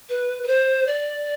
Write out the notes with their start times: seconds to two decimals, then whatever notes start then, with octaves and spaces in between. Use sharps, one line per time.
0.09 B4
0.43 B4
0.48 C5
0.87 D5